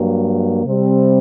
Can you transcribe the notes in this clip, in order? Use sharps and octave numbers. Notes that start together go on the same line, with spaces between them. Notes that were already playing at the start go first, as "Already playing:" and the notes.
Already playing: G2 F#3 A#3
C3 G3 C4